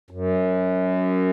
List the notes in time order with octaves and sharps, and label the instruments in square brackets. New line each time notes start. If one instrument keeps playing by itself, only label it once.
[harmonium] F#2